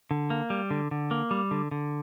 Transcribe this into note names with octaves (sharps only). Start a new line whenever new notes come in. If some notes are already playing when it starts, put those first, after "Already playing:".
D3
A#3
G3
D3
D3
A#3
G3
D3
D3